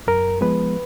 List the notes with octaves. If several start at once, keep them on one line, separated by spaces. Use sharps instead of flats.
F#2 A#4
F3 G#3 B3 B4